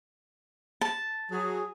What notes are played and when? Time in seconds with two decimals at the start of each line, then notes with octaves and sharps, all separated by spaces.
0.81 A5
1.32 F#3 G#4